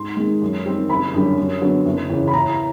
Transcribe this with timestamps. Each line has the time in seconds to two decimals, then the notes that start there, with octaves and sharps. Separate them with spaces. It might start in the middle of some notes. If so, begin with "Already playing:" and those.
Already playing: G#2 C6
0.17 D#3 G#3
0.42 F#2
0.66 D#3 G3 C4
0.89 F#1 B5
1.13 F#2 D3 G3
1.38 F#2
1.61 D3 F#3 B3
1.86 F#1
2.10 E2 C#3
2.27 B5
2.33 A2 A#5
2.50 A#5